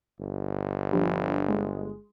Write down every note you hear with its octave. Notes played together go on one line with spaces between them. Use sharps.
G1
A#1 F3 G3
G#3